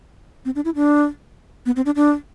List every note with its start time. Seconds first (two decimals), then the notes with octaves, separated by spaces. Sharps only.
0.45 C4
0.55 D4
0.65 E4
0.75 D4
1.66 B3
1.76 C4
1.86 D4
1.96 D4